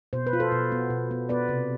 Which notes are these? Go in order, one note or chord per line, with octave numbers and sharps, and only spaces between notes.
B2 C5
B4
F4
A4 C5
B2
B3
B2
B3
B3 B4 D5
C3